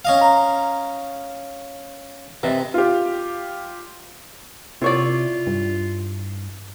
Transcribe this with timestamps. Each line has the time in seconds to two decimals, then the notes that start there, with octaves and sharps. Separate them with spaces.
0.05 C#4 D#5 F5
0.21 A#5
2.43 C3 B4 D#5 E5
2.74 F4 G4
4.82 C3 E4 F4 C#5 D5
5.47 G2